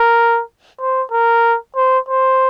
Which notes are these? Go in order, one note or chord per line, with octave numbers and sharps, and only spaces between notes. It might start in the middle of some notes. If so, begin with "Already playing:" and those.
Already playing: A#4
C5
A#4
C5
C5